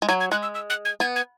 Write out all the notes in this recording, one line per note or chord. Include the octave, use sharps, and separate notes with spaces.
G#3
F#3 G#6
G#6
G#3 F#6
E6
E6
F#6
G#6
B3 G#6
G#6